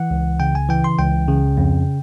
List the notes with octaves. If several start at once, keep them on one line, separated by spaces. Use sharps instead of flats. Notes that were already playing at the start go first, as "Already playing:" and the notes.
Already playing: E3 F#5
C#2
C#3 G5
G#5
E3 G5
C6
C#2 G5
C#3
F2